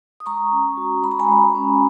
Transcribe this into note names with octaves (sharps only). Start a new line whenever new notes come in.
D#6
G#3 A#5 C#6
C#4
F#4
G#3 B5
A#5
G#5 B5
G#3
C#4